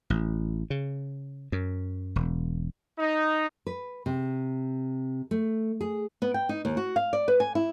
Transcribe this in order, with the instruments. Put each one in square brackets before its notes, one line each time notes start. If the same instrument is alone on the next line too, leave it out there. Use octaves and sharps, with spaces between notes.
[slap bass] A1
C#3
F#2
E1
[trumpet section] D#4
[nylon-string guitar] B4
C3
A3
G#4
B3
G5
D#4
D#2
F#4
F5
D5
B4
G#5
E4